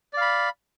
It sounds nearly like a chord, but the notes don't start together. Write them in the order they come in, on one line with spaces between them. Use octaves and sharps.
D5 F5 B5